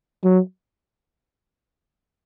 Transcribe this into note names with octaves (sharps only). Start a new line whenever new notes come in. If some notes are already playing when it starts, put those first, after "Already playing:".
F#3